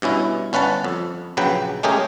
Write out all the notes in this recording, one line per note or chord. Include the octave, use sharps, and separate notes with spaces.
G2 B2 C#4 E4
G1 C#4 B4 F#5 A5
F2
A#1 C#3 F#3 B4 G5
G#3 A3 C#4 G4 G#4 A#4